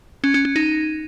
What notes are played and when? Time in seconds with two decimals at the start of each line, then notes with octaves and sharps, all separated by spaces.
0.24 C#4
0.34 C#4
0.45 C#4
0.56 D#4